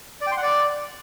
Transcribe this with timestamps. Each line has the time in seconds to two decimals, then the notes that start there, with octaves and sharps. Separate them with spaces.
0.21 D5
0.26 G5
0.32 C6
0.37 F#5
0.42 D5